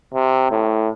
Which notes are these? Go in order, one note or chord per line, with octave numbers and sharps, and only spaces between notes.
C3
A2